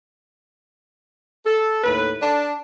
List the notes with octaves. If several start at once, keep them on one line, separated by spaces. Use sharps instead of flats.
A4
D#2 A2 B4
D4